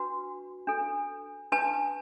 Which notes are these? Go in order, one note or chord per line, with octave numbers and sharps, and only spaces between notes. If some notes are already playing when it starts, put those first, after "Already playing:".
Already playing: D4 F#4 B4
D4 A4
D4 B4 A5